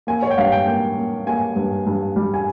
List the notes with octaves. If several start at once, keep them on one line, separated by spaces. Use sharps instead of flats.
A#3 G#5
C#5
G5
G2 F5
G5
A#3 G5
A#3
A#3 G#5
G2
G2
G3
G#5